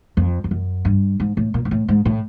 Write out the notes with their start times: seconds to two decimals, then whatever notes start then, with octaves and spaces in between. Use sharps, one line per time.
0.17 F2
0.44 F2
0.51 F#2
0.85 G2
1.20 G#2
1.37 A2
1.54 A#2
1.65 G#2
1.71 A2
1.88 G#2
2.05 A2